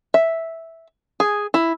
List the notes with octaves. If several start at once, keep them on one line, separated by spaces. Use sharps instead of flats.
E5
G#4
E4